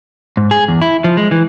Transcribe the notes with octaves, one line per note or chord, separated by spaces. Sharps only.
G#2
G#4
E2
E4
F3
G#3
E3